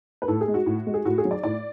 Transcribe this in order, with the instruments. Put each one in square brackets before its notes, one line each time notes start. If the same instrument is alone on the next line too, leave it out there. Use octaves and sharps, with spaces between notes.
[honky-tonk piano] B4
A2 A4
G#4
G#3
F#4
A2
G#3
G#4
A2 F#4
G#4
F#3
D5
A2 D5